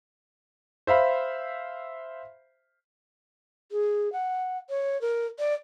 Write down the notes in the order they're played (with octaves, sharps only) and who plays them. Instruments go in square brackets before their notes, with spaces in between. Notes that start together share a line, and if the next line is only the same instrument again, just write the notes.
[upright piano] C5 E5 F5 B5
[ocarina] G#4
F#5
C#5
A#4
D5